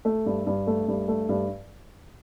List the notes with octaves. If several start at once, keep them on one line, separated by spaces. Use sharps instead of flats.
A3
G2
G2
A3
G2
A3
G2